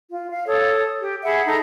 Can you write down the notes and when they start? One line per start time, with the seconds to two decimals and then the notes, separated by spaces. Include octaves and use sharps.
0.10 F4
0.31 F5
0.46 A4 C#5 D#6
1.01 G4
1.24 G#4 E5 F#5 B5
1.46 D#4 A4 A#5